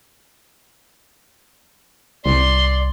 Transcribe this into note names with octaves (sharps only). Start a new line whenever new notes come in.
C2 D5 C6